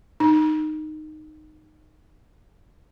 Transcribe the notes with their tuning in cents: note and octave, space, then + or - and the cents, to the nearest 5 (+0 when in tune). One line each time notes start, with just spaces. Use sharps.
D#4 -15